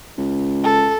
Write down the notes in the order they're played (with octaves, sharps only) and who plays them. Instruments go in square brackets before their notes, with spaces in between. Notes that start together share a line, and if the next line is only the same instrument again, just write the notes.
[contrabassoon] C#2
[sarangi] A4